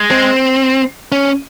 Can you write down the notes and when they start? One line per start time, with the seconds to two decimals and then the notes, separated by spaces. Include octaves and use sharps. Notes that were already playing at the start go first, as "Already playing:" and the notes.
Already playing: G#3
0.11 C4
1.12 C#4